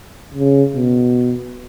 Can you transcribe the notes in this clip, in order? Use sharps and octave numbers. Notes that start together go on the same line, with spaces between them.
C#3
B2